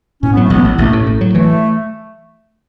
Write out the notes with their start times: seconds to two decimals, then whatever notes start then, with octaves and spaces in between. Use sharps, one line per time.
0.22 A2 C#4
0.32 B3
0.37 F#3
0.42 A3
0.50 A1 B3
0.65 A1
0.78 A1 A3
0.93 A2
1.06 A2
1.21 F#3
1.35 E3 A3